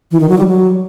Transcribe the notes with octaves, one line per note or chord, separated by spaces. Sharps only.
E3
D#3
F#3
G3
F#3